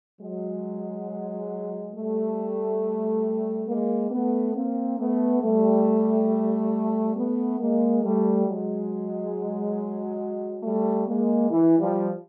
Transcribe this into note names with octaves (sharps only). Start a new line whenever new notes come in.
F#3 G#3
G3 A3
G#3 A#3
A3 B3
A#3 C4
A3 B3
G3 A3
A3 B3
G#3 A#3
G3 A3
F#3 G#3
G3 A3
G#3 A#3
E3
F3 G3